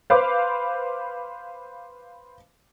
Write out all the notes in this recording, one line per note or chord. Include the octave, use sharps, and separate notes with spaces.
B4 C5 F5 B5 D6